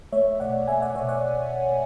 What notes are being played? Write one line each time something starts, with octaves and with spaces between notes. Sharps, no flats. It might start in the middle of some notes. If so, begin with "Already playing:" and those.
A3 C#5 E5
B2 D5 F#5
A3 E5 G#5
D5 F#5
B2 C#5 E5
D5 F#5